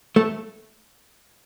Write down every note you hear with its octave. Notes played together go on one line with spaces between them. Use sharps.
A3